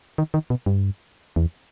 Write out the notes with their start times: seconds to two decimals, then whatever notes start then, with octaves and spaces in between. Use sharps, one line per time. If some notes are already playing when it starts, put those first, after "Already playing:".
0.18 D#3
0.34 D#3
0.50 B2
0.66 G2
1.36 E2